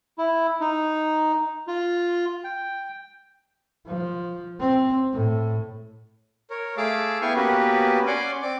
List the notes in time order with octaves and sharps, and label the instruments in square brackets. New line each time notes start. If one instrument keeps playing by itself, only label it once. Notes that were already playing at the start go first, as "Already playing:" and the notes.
[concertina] E4
D#4
F4
G5
[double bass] F3
C4
A2
[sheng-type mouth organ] A#4 C#5
A3 G#4 F5 A5 D6 E6
B3 E4 F5 G5 G#5 C#6
A#3 B3 C#4 F#4 G4 B4
C#4 D5 F#5 G#5 C6 D6
C4 D5 D6